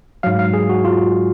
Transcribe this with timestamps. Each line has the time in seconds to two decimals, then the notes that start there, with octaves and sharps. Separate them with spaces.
0.23 G#2 F#3 F5
0.39 F5
0.54 G#4
0.69 F#4
0.85 F4